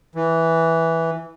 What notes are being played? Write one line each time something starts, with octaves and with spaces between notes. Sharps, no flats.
E3